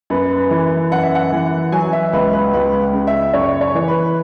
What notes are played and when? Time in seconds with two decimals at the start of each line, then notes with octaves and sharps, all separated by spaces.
0.10 F#2 B4
0.37 B4
0.51 E3
0.91 F#2 F#5
1.03 E5
1.15 F#5
1.32 E3
1.72 F#3 G#5
1.93 E5
2.13 C#2 B4
2.33 B4
2.54 C#2 B4
2.93 C#3
3.07 E5
3.34 F#2 C#5
3.61 C#5
3.75 E3
3.88 B4